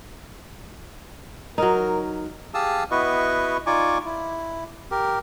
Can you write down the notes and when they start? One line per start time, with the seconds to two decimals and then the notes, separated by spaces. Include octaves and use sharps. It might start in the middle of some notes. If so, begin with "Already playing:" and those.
1.58 F#3 D#4 A#4
2.54 G4 G#4 F5 A5 D#6 E6
2.91 B3 E4 F#4 B4 D#5 C#6
3.66 D#4 F4 D5 G#5 C#6 D6
4.05 E4
4.91 G4 A#4